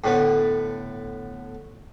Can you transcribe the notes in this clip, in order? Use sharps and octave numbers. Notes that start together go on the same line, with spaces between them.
A2 D3 B3